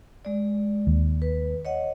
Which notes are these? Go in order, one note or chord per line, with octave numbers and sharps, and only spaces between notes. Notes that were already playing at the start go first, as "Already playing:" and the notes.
G#3 D5
D#2
B4
C#5 D#5 F#5